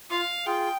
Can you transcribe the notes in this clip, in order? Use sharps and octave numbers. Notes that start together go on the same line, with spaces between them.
F4 F5
F4 G#4 G5